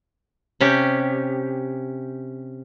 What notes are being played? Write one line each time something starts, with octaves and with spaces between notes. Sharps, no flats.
C3 C#4 G4